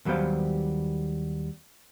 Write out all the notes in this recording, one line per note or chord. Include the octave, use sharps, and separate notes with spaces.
D#2 F#3 G3 B3 C5 F5